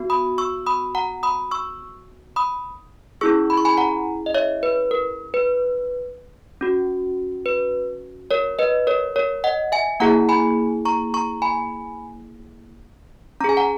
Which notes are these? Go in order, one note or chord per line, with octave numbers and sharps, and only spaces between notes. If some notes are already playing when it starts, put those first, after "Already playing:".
Already playing: B3 F#4
B5 D#6
C#6 E6
B5 D#6
F#5 A#5
B5 D#6
C#6 E6
B5 D#6
C#4 E4 G#4 C#6 E6
B5
C#6
G#5 B5
F#5 A#5
D#5
C#5 E5
B4
A#4
B4
C#4 F#4
B4
A#4 C#5
B4 D#5
A#4 C#5
A#4 C#5
D#5 F#5
E5 G#5
A#3 E4 G#4 F#5 A#5
G#5 B5
A#5 C#6
A#5 C#6
G#5 B5
C#4 G#4 G#5 A#5
F#5 A#5